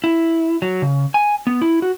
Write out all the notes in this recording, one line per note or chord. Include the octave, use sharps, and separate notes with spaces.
E4
F#3
C#3
G#5
B3
E4
F#4